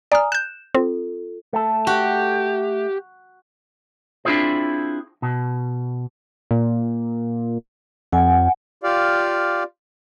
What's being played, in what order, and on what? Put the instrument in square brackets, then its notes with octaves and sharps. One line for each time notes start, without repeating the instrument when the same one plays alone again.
[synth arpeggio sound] D5 F6 [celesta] G#5 A#5 D#6
[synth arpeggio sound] F#6 G6 [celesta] E7
[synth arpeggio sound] C4 [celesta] F4 A4
[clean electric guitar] A3 A4
[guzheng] F#4 [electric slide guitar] G4
[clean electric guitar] C4 D4 E4 F4 G#4 C5
B2
[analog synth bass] A#2
[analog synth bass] F2 [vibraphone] F#5 G#5
[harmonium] F4 G4 D5 F5